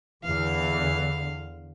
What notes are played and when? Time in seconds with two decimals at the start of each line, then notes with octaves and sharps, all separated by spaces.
0.24 E2 D3 E3 F5